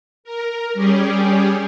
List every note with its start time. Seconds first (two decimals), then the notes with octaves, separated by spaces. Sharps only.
0.24 A#4
0.73 G3 C#4 G4 G#4